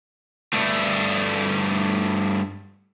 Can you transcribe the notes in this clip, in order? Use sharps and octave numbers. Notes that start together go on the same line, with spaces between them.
G2 A3